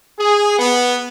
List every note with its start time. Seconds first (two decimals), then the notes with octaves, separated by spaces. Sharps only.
0.19 G#4
0.59 B3